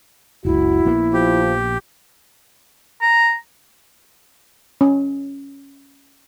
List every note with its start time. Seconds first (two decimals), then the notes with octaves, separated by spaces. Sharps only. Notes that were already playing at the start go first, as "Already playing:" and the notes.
0.45 F#1 C#2 E4 F#4
0.85 A#1 A#3 B3
1.13 F3 G4
3.02 A#5
4.81 C#4